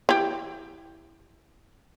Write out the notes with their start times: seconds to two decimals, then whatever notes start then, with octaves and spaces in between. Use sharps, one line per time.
0.09 E3 G4